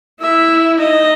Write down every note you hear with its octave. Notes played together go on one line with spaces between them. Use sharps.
E4 E5
D#4 D#5